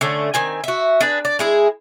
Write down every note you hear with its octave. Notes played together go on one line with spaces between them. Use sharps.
D3 A3 C#4
D#3 C4 G#5
F#4 E5
D4 G#4 B4
D5
G#3 E4 G#4